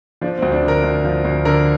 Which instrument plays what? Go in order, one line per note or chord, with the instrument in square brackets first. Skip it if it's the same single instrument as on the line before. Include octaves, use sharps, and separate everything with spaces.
[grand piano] F3 D4
C4
D2
D4
D3
A#4
D2
F3
D2
D3 A#4